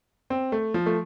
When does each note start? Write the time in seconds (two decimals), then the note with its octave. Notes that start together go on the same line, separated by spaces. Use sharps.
0.30 C4
0.52 A3
0.74 F3
0.86 A3